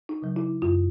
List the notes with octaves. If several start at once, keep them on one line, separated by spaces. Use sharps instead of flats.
D#4
C#3 F#3
E4
F#2 F4